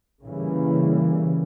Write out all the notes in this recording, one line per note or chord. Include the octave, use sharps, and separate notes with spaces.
C#3 E3 G3 A#3